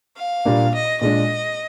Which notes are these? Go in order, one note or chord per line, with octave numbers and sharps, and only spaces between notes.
F5
A#2 G3 A#3 D4
D#5
A#2 G#3 D4 D#5